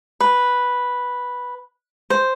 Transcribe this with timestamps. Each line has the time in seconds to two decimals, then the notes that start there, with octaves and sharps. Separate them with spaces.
0.20 B4
2.10 C5